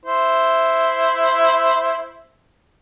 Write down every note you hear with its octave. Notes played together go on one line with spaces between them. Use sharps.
E4 C5